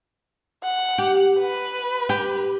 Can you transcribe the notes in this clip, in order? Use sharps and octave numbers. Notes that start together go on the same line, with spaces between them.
F#5
G4
B4
G4